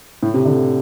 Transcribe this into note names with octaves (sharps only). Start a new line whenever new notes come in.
A2
C3
D3